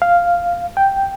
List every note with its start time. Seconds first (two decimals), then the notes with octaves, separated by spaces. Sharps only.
0.02 F5
0.77 G5